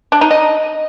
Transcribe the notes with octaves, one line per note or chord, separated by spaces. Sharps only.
D4
D#4
D#5